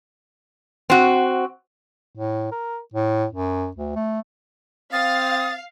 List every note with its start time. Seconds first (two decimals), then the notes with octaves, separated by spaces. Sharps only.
0.90 C4 F#4
2.16 A2
2.52 A#4
2.94 A2
3.31 F#2
3.76 D2
3.96 A3
4.93 C4 F5 D#6 A6